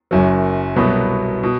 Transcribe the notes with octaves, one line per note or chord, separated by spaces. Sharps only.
F#1 F#2 F#3
C2 B2 F#3 B3
B2